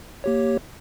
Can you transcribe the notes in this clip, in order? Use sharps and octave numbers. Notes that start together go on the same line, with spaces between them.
A#3 G4 C#5